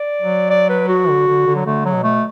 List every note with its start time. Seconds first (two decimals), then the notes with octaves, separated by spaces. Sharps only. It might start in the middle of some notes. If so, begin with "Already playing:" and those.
Already playing: D5
0.21 F#3
0.50 D5
0.70 B4
0.89 F#4
1.09 D3
1.28 D3
1.46 D3
1.56 F#3
1.66 D3 A3
1.85 F#3
1.95 B2
2.04 A3